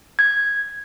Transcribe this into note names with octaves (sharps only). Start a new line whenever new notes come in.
G#6